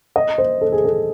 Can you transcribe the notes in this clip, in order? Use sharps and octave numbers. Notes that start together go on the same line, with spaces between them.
D#5
C5
A4
G#4
A4